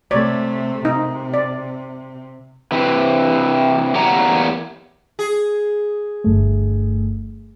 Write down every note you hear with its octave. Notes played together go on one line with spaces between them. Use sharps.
C3 A3 C#5 D5
C3 D#4
D5
C3 E3
E2 A#3 G4 C#5 F#5 A#5
G#4
G1 G2 A3